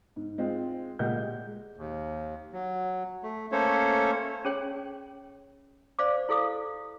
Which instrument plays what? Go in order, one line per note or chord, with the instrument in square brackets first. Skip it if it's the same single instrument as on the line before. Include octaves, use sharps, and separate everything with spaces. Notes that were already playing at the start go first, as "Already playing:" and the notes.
[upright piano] G#2
G#3 C4 F4
A#2 G#3 G4 A#4 F#5 G6
G#3
[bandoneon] D#2
F#3
A3
A3 A#3 C#4 A4 C5 C#5
[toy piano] C#4 G#4 C#5 G5
C5 D5 F5 D6
E4 A4 F5 D6 D#6